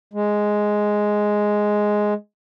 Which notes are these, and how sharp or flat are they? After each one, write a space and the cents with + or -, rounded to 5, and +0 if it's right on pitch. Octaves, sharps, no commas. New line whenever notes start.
G#3 +5